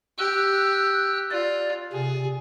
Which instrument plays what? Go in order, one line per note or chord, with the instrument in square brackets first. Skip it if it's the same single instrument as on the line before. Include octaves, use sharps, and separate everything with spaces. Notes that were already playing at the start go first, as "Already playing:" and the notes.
[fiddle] G4 [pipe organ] E6 F#6
[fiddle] F4 [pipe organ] D5
[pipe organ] C3 [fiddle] G#4